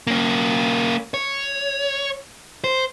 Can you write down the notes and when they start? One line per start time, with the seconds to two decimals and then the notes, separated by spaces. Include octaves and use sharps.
0.07 A#3 C#4
1.14 C#5
2.64 C5